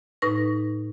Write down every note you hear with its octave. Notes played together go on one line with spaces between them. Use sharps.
A2 D#4 B4 A#6